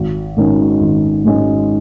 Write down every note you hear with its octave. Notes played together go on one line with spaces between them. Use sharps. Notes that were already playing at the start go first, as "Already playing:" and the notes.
Already playing: G#1
G#2 D#3 G#3 C#4
G#1
G#2 D#3 G#3 C#4